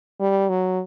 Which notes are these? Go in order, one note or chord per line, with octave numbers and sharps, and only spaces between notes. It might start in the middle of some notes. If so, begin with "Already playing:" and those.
G3
F#3